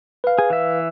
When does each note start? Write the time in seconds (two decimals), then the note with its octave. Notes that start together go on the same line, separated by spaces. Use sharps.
0.24 B4 F5
0.39 G#4
0.50 E3 E5